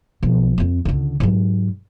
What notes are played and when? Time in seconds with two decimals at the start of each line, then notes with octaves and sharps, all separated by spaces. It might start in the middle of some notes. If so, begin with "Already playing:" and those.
0.23 B1 F3
0.58 F2 C4
0.85 C#2 D3
1.20 G#2 F#3